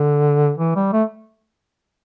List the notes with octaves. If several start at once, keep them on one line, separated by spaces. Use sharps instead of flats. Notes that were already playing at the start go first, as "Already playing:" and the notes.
Already playing: D3
E3
G3
A3